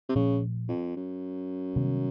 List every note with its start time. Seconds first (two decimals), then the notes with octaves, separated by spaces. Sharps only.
0.09 C3
0.15 A#2 C#3 F3 A3
0.68 F2
0.96 F#2
1.76 C3 D#3 G3 B3